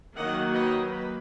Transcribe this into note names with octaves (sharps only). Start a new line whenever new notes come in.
D#3 F#3 A#3 D#5 F#5
B4 D#5
B4